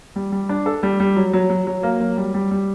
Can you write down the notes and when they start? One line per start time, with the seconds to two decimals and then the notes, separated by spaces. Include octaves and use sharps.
0.16 G3
0.32 G3
0.49 D4
0.66 A4
0.83 G3
1.00 G3
1.16 F#3
1.33 F#3
1.50 F#3
1.67 F#3
1.83 A#3
2.01 F#3
2.17 G3
2.34 G3
2.51 G3